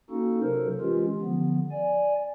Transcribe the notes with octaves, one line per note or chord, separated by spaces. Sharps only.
A#3 C#4 D#4 F#4 A4
C3 F#3 A4 A#4 C5
E3 G#3 C#4 F4 G4
D3 F3 B3
D5 G#5